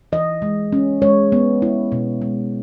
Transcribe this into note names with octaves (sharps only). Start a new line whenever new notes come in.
E3 D#5
G#3
C#4
G#3 C#5
B3
E4
B2
G#3